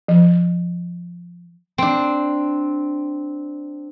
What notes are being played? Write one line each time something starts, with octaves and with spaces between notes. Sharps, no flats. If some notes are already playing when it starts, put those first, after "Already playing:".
F3
C4 D4